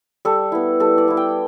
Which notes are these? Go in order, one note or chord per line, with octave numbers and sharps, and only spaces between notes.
G3 A4
B3 E4
G3 A4
D5
B3 E4
G5